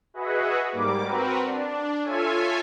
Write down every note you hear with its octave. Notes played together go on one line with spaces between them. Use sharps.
F#4 G#4 B4 D#5 E5 F#5
G#2 G3 A#3 D6
C4 F#4 A#4 B4
D4
F4 A4 C#5 E5 G#5